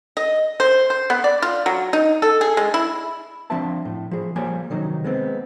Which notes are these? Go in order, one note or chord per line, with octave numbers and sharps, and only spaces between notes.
D#5
C5
C5
B3
D5
F4
F#3
D#4
A4
G#4
G#3
E4
F3 C4 D4 F4 E5 A5
A2
F3 G#4
F3 G3 A#3 G4 C#5 G#5
C3 D#3 F#3 D#4
G#3 B3 C4